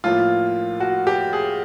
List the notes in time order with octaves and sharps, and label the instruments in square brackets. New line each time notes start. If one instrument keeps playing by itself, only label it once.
[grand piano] A2 F3 A#3 F4
F#4
G4
G#4